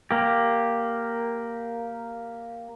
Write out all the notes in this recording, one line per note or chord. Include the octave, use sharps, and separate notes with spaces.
A#3 G4